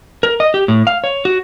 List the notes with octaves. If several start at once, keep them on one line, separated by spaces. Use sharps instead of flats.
A#4
D#5
G4
A2
F5
C#5
F#4